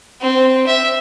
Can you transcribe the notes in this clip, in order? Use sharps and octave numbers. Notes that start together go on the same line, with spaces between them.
C4
E5